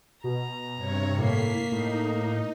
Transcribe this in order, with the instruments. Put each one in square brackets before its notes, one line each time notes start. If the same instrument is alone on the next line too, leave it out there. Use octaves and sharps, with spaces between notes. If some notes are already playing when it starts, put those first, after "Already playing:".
[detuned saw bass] B2 [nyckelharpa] A#5
[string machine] G2 C3 C#5
[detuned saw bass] A2 [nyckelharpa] A#3 [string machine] B6 C7
[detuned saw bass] A2 [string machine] D#4